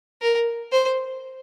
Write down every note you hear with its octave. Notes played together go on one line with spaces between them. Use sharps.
A#4
C5